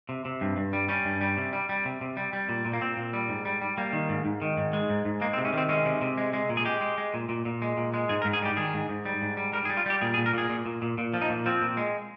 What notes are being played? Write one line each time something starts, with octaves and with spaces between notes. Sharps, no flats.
C3
C3
G2
G2
G3
G3 C#4
G2
G3
C3
G3
G3
C3
C3
G3
G3
A#2
A#2
A#3
A#2 C4
A#2
G3
G#2
G3
G3
G3 A#3
D#3
G#2
G#2
D#3
G#2
G#3
G#2
G#2
G#3 A#3
C4
C3
C#4
D#3 C4
G#3 C#4
C3
C3
G#3
G#3
A#2
G#4
G#3 G4
G#3
G#3
A#2
A#2
A#2
G#3
A#2
G#3
G#2 G#4
A#4
G#2
G#4
G3 G4
D#3 G#4
G#2
G#2
G3
G#2
G3
G3 A#4
G#4
G3
F4
G3 G4
A#2 G#4
G#4
A#2
A#4
A#2 G#4
A#2
A#2
A#2
A#2
F3
D#4
A#2
F3 C4
A#2
G#3